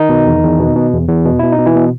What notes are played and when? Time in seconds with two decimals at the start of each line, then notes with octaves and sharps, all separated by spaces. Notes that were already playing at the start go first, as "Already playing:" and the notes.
Already playing: D#3 D#4
0.09 B2
0.26 E2
0.43 E2
0.59 B2
0.76 B2
0.93 E2
1.08 E2
1.25 B2
1.39 B2 E4
1.52 D#4
1.59 B2
1.66 E3 E4
1.75 B2